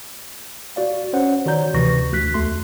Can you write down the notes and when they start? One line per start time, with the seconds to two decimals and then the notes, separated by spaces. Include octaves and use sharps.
0.76 F#4 D5 F5
1.13 C#4 C5 C#5 F#5
1.46 D#3 F#4 C#5 D5 A#5 G6
1.74 D2 C3 E3 B4 C#6 A#6
2.12 D2 F#4 F#6 B6
2.34 E2 A3 C6